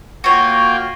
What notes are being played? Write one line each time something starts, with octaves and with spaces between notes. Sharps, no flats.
A#3 F4 F#4 C#5 G5